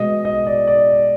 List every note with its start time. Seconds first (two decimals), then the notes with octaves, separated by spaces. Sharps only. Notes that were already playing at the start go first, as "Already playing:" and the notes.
Already playing: B2 G#3 D#5
0.25 D#5
0.47 D5
0.67 D5